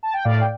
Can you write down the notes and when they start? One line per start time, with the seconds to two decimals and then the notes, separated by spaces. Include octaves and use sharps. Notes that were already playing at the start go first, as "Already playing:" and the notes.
0.03 A5
0.13 G5
0.24 A2 D5 F5
0.41 G5